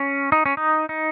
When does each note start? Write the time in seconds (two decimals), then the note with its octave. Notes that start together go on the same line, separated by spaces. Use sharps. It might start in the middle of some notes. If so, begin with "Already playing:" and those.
Already playing: C#4
0.32 D#4
0.46 C#4
0.57 D#4
0.89 D#4